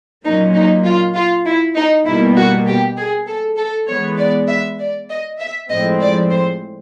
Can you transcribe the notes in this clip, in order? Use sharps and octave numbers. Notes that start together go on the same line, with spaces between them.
A#2 F#3 A#3 C#4 D#4
D#4
F4
F4
E4
D#4
B2 G3 A#3 E4
F#4
G4
G#4
A4
A4
E3 G#3 B3 C#5
D5
E5
D5
D#5
E5
A2 F3 G#3 C4 D#5
D5
C5